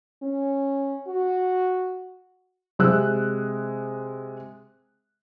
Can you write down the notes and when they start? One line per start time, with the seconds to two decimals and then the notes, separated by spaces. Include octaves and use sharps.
0.23 C#4
1.08 F#4
2.79 C3 G#3 E6 F#6